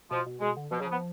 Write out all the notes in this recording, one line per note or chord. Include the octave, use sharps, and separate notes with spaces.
B2 F3
B2
B2 G#3
D3
B2 F3
C#3 F#3
F3
B3